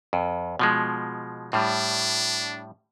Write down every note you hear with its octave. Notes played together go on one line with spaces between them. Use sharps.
F2
B2 F3 G#3
A2 G3 D4